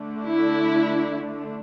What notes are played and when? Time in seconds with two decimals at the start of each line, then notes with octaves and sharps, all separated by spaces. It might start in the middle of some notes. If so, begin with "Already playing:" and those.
Already playing: D3 A3 D4
0.25 E4